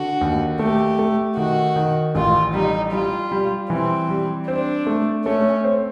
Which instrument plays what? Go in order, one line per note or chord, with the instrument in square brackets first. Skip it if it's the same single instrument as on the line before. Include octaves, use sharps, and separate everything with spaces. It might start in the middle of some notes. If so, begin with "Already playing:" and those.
Already playing: [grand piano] D3 [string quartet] F#4
[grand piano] D#2
[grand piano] A3 [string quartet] G4
[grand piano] A3
[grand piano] D#3 [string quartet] F#4
[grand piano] D#3
[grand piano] A1 [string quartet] F4
[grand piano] G3 [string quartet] D#4
[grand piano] G3 [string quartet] F4
[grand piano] G3
[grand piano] E3 [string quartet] C4
[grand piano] G3
[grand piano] C4 [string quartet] D4
[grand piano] A3
[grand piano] A3 [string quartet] C#4
[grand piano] C4